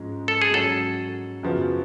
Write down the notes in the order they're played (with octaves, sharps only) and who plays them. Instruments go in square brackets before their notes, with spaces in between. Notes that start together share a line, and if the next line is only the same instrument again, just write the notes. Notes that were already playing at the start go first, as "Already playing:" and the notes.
Already playing: [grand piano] G#2 F3 G#3 C#4
[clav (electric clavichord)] A4
G#4
[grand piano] G#2 F#3 C#4 F#4 C#5 [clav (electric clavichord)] A4
[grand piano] F#2 C#3 F3 B3 F#4